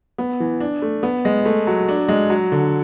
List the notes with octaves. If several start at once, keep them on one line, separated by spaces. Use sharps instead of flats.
B3
E3
D4
A3
B3
G#3
A3
F#3
D4
G#3
F#3
D3